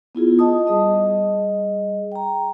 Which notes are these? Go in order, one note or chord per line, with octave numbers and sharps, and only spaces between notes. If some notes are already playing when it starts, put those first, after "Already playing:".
B3 E4 F4 G#4
D#5 A5 D#6
G3 G#4 D#5
G5 A#5